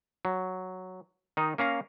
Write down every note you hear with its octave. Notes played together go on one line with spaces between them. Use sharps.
F#3
D#3 D#4
A#3 C#4 F5 A#5